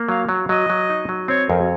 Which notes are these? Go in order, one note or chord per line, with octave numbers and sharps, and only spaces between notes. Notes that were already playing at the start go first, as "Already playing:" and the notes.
Already playing: A#3
F#3 F5
F#3
F#3 D#5
F#3
D#4
F#3
C4 C#5
F2 A#4
F#4